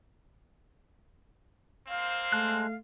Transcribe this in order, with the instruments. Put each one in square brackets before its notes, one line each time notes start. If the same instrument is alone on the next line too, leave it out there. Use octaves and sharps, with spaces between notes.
[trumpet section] A#3 C4 C5 [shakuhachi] F5
[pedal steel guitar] G#3 A5 F#6 [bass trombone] A3